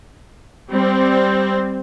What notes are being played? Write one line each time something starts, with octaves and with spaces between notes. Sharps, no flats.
G3 C4